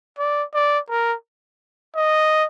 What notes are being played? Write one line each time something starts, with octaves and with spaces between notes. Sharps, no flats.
D5
D5
A#4
D#5